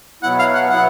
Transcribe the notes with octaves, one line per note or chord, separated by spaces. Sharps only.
B2 F#3 B3 E4 F#5
F5
F#5
F#3 B3 E4 F#5